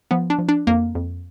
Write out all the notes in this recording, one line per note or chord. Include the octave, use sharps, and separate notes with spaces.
F3 B3
D4
F3
D4
F2 A#3
F2